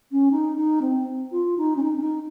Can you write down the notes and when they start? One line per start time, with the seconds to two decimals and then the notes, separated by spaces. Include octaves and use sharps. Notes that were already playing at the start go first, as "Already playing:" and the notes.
0.12 C#4
0.31 D#4
0.57 D#4
0.82 C4
1.32 F4
1.58 D#4
1.76 C#4
1.83 D#4
1.97 C#4
2.01 D#4